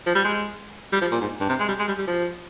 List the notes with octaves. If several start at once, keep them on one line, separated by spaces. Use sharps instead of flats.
F3
G3
G#3
G3
F3
A#2
G#2
G2
C3
G#3
G3
G#3
G3
G3
F3